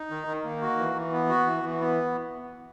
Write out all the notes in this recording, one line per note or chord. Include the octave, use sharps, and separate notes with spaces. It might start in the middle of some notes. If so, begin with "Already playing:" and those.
Already playing: D#4
D#3
D#3
A#3
F#4
E3
E3
B3
F#4
E3
E3
B3